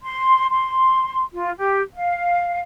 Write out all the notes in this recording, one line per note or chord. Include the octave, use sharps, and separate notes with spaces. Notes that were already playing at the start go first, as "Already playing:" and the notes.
C6
C6
F4
G4
F5